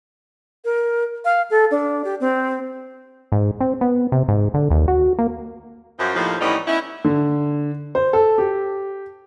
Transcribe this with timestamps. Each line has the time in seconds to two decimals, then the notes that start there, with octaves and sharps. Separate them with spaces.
0.65 A#4
1.25 F5
1.50 A4
1.71 D4
2.04 G4
2.20 C4
3.32 G#2
3.61 C4
3.81 B3
4.12 C3
4.28 G#2
4.54 D3
4.71 D#2
4.88 F#4
5.19 A#3
5.99 F#2 F3
6.15 D#2 A2 D#3 F3
6.41 A2 E3 G3 B3 C#4 D#4
6.67 B3 C#4 D#4 E4
7.04 D3
7.95 C5
8.13 A4
8.38 G4